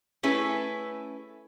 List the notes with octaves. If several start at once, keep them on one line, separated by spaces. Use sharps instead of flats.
A3 C#4 E4 G#4 B4